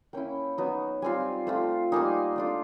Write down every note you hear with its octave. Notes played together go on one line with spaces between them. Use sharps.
A#3 C#4 E4 G5
F#3 B3 D#4
G3 C4 F4 G#5
A3 C4 F4
G3 A#3 D#4 G#5
A3 D4 F4